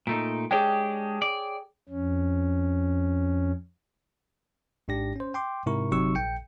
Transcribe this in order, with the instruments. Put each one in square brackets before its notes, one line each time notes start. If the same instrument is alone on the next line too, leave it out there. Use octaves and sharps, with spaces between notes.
[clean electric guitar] A#2 A3 D#4 [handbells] D7
[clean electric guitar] G#3 D4 G4 [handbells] G#4 C#5 G5
[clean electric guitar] D5
[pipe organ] F2 C#4
[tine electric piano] G#1 G#2 D4 G4 A#6
C#4 C5
G5 C6 D6
G#2 C3 E4 A#4 C#6
G1 C3 F#3 D#4 C#6 E6
A#1 G5 C#7